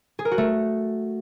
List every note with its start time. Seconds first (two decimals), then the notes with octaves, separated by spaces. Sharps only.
0.19 G#4
0.25 A#4
0.31 F#4
0.38 A3